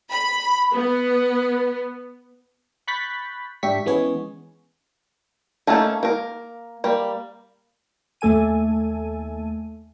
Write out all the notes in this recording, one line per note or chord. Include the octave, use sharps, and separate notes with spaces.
B5
B3
B5 C#6 F#6 G6 A6 B6
G#2 D4 G4 E5 C#6 B6
E3 G#3 B3 C#4 G#4 C#5
A3 A#3 C#4 D#4 A4
A#3 A#4
G3 A#3
D#2 A3 A4 G#5 D#7